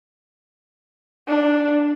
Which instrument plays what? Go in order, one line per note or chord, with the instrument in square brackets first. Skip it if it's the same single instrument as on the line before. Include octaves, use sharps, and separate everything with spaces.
[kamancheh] D4